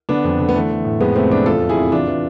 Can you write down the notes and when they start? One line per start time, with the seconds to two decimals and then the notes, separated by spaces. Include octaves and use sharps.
0.09 D3 B3 D4
0.24 F2
0.39 D3
0.49 B3
0.54 E3 A3
0.70 E3
0.85 A2
1.00 F2 G#3 B3
1.15 C3 A3 C4
1.31 F2 B3 D4
1.46 E2 F4 A4
1.62 E3
1.69 E4 G#4
1.77 C3
1.92 E3 D4 F4
2.07 E3